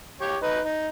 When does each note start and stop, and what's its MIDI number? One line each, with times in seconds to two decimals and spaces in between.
0.21 0.37 67
0.21 0.37 73
0.43 0.60 63
0.43 0.60 71
0.65 0.88 63